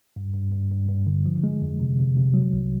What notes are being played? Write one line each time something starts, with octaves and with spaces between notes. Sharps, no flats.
G2
G2
G2
G2
G2
D3
F3
G#3
F2
C3
C3
C3
F#3
C2